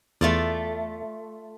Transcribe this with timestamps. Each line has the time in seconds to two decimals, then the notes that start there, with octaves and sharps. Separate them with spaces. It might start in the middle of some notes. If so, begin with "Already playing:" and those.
0.21 E2 A3 F4 D5